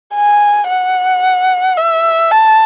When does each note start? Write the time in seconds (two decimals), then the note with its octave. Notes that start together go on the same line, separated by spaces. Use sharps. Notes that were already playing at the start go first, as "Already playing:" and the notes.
0.15 G#5
0.68 F#5
1.77 E5
2.31 A5